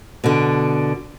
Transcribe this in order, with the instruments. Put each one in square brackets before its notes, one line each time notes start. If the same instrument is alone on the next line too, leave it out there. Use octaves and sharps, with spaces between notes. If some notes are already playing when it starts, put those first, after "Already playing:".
[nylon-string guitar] B2 D3